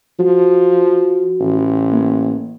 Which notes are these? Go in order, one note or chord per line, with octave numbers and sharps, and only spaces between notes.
F3 F#4
A1
A#3